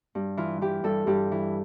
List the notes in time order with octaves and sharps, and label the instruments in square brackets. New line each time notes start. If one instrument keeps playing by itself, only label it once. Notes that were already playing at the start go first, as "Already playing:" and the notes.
[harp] G2
E3 F4
E3 G4
G2 A4
G2 G4
E3